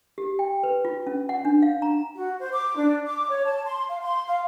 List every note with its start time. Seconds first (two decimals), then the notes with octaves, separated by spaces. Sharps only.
0.18 G4
0.39 G5
0.63 B4
0.85 F4
1.07 C#4
1.29 F#5
1.45 D4
1.62 F5
1.82 A#5
2.15 F#4
2.40 C5
2.52 D6
2.76 D4
3.06 D6
3.29 C#5
3.45 A5
3.66 C6
3.89 F5
4.02 C6
4.28 F5